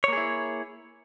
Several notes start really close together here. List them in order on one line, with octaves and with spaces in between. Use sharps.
C#5 A#3 G#4 E4